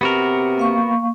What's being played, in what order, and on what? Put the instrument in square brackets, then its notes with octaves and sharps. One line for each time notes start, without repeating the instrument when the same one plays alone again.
[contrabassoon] C3 [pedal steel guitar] B3 F#4 A#4
[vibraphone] A#3 F5 C#6